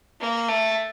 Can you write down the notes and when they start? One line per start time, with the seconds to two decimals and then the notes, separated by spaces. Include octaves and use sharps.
0.20 A#3
0.48 A3